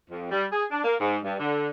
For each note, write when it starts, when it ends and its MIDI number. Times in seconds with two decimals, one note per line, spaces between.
0.10 0.30 41
0.31 0.45 55
0.51 0.65 68
0.71 0.80 62
0.84 0.94 58
0.99 1.18 44
1.24 1.35 43
1.39 1.69 50